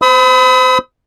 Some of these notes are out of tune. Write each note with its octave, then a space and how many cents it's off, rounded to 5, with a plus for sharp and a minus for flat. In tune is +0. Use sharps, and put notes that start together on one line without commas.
C5 -25 B5 +35 D#6 +45